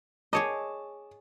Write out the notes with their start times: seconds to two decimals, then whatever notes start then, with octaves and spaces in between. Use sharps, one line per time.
0.33 G#4 C#5 D#5 A5 D6 D#6